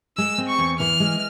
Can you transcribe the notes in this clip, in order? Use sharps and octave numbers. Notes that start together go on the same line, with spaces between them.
G#3 E6
C4
C#6
E2
E3 F6
G#3